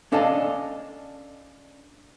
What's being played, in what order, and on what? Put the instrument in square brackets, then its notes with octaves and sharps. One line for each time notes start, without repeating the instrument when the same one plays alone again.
[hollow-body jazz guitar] C#4 D4 A4 D#5 F5 A5